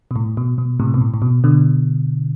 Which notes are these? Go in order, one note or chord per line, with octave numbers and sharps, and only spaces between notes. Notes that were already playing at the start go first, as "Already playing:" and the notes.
B2
A2
B2
B2
A2 C3
B2
A2
A2
B2
B2 D3